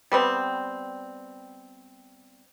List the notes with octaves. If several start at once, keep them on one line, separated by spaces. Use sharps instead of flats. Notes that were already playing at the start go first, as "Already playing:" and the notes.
G3 B3 C4